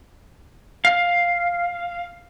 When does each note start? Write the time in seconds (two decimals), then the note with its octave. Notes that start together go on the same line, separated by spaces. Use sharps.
0.85 F5